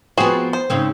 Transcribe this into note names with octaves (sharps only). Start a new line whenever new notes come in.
F3 B3 C4 F#4 G#4
C5
G#2 C#3 C4